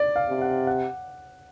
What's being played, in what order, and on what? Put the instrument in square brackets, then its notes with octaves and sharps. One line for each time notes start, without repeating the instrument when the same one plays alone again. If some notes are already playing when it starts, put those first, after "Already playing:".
Already playing: [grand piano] D5
F5
[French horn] C3
[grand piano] F#5
F#5